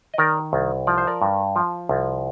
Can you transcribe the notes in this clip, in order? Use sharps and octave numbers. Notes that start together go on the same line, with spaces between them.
D#5
D#3 A#4 D5
C2
F3 D5
C5
A#4 D5
G2
F3
C2